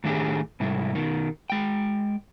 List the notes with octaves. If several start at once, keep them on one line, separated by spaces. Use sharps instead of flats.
A2 D#3 A3 D4 G4 G#4
G#2 C3 G3 E4
B2 D#3
G#3 G5